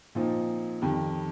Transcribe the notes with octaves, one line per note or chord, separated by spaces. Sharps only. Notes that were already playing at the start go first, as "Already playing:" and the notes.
A#2 F3 C4 D#4
F2 D#3 G3